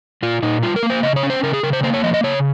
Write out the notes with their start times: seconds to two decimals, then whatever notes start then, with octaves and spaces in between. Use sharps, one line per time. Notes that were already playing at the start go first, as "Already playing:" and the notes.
0.23 A#2 F4
0.42 A#2 D#4
0.63 G3 F4
0.76 A#4
0.83 A#3
0.90 C5
1.03 C#3 D#5
1.16 C#5
1.23 C#4
1.30 C5
1.43 C#3 A#4
1.53 G#4
1.63 C#3 A#4
1.73 C5
1.83 A#3 C5
1.93 C#5
2.04 F3 D#5
2.14 D#5
2.23 C#3 C#5